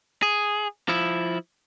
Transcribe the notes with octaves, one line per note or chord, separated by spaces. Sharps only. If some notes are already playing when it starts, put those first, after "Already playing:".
G#4
F3 E4